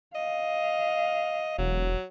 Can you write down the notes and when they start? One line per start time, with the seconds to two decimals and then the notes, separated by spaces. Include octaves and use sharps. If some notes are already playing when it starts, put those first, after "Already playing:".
0.15 D#5 F5
1.58 E1 F#3